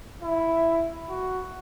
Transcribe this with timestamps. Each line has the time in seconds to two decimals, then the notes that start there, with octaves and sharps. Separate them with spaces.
0.22 E4
1.09 F#4